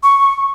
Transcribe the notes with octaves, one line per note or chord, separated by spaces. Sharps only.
C#6